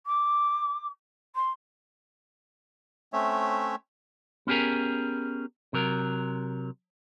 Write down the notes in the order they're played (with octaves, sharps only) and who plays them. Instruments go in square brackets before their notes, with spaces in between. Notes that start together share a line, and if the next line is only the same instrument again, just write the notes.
[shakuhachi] D6
C6
[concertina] A3 C4 C#4 C#5 E5
[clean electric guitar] B3 C#4 G4 G#4 A#4
C3 F#3 A#4